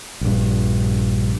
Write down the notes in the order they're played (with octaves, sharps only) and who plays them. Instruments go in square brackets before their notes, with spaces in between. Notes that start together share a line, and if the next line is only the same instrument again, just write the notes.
[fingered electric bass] A#1 G2